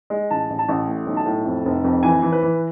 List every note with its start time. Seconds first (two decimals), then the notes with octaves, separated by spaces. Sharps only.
0.10 G#3
0.31 A1 A5
0.50 A1
0.59 A5
0.69 A1
0.88 A2
1.07 B1
1.17 A5
1.26 A2
1.45 F2
1.65 F1
1.84 F2
2.03 E3 G#5
2.22 E3
2.32 B4
2.42 E3